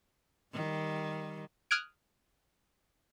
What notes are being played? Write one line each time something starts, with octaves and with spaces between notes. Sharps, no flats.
D#3 G3
D#6 F6 F#6 G#6 D7